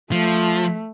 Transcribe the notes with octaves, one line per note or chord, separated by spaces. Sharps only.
F3 A3